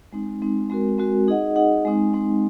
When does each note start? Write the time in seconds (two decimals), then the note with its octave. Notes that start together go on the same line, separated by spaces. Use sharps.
0.12 G#3 C4 D#4
0.42 G#3 C4 D#4
0.70 G#3 C4 F#4 A#4
0.98 G#3 C4 F#4 A#4
1.28 D#4 G#4 D#5 F#5
1.56 D#4 G#4 D#5 F#5
1.85 G#3 C4 D#4
2.13 G#3 C4 D#4